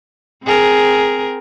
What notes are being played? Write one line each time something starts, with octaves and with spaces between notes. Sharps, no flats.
C4 G#4 A#4